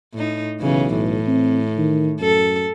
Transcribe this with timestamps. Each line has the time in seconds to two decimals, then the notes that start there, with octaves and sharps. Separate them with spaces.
0.14 A2 D#4
0.60 B1 C#3 E3
0.96 A2
1.27 C4
1.77 D#3
2.21 F#2 A4